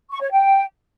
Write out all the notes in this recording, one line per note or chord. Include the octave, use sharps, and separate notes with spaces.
C#6
C#5
G5